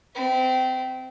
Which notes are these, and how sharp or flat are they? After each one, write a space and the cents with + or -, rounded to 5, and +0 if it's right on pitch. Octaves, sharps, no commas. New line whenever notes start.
C4 -25 E5 +0